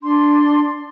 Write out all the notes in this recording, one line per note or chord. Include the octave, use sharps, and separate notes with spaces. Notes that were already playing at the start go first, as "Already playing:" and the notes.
D4 C6